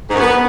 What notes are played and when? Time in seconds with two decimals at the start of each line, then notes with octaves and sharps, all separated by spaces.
0.09 G#2
0.14 F#2
0.20 B3